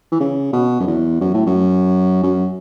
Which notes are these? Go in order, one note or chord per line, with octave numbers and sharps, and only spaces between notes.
E3
C#3
B2
F#2
E2
F#2
A2
F#2
F#2